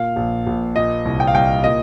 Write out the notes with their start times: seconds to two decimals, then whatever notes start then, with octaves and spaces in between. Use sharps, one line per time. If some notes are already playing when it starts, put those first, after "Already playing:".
Already playing: A#2 F5
0.16 A#1
0.47 A#1
0.76 A#2 D#5
1.05 C2
1.20 G5
1.27 F5
1.35 C2 G5
1.64 A#2 D#5